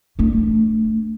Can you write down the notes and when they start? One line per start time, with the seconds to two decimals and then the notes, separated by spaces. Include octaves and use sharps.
0.19 A3 D4